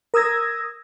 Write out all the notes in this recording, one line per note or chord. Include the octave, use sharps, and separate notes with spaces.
A#4 D#6 E6 G#6 A#6